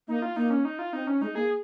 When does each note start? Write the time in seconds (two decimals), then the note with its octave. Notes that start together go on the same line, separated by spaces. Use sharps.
0.08 A#3 D#4
0.22 F4
0.36 A#3 D#4
0.50 C#4
0.65 D#4
0.79 F4
0.93 C4 D#4
1.07 C#4
1.21 G#3 D#4
1.35 A#3 G#4